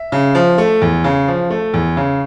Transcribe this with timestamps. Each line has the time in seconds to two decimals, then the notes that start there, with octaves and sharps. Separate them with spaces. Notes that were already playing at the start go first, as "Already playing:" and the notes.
Already playing: E5
0.12 C#3
0.35 F3
0.58 A3
0.82 E2
1.04 C#3
1.28 F3
1.50 A3
1.74 E2
1.97 C#3